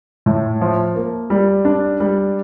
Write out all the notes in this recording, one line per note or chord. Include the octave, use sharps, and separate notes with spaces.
A2
F3
A#3
G3
D4
G3